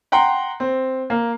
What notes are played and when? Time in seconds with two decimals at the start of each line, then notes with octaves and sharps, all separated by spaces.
0.12 F#5 G5 A#5 C6
0.60 C4
1.10 A#3